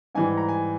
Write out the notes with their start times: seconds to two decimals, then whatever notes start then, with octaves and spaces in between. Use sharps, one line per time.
0.15 G#2 E3 G3 G#5
0.37 A#5
0.48 G#5